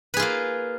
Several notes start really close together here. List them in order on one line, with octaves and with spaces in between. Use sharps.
B4 G#4 F4 A#3